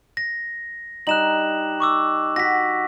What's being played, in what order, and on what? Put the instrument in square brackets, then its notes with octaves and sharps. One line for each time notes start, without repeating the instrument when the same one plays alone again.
[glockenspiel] A#6
[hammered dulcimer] G3 D#4 D#5 [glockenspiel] F#6 E7 F#7
[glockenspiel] C#6 D6 E6
[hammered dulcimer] F#4 [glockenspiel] A#6 B6